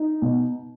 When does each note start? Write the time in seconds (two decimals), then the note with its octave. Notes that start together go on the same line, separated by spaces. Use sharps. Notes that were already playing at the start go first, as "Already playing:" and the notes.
Already playing: D#4
0.22 B2